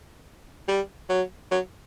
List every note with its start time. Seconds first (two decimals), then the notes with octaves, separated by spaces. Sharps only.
0.68 G3
1.09 F#3
1.51 F#3